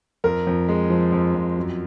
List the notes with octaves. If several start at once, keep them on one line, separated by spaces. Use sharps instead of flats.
F2 A#4
F2
G#3
F3
F2
F2
F#2